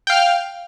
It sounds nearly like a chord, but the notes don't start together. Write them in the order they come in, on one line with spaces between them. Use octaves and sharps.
G5 F5 F6